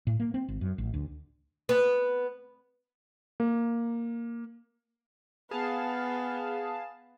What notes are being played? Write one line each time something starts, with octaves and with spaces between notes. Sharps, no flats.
A2
A#3
C4
G#1
F#2
A1
D2
B3
A#3
B3 G#4 F5 A5